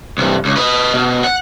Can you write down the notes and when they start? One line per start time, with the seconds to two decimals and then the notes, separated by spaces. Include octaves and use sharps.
0.18 C2 G2
0.45 C#2
0.57 B4 D#5
0.94 B2
1.24 F#5